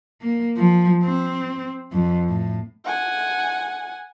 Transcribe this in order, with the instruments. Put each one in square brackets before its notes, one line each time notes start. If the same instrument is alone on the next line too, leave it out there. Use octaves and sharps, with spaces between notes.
[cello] A#3
F3
C4
F2
A2
[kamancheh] F#5 G#5